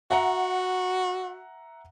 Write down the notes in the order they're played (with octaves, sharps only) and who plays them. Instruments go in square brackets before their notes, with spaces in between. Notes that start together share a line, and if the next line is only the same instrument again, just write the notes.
[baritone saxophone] F#4 [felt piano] E5 F#5 A#5